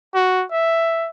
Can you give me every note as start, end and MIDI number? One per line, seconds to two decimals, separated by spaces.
0.15 0.45 66
0.51 1.09 76